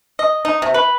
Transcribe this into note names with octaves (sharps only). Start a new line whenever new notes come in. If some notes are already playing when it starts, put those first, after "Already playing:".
D#5
D#4
C3
B4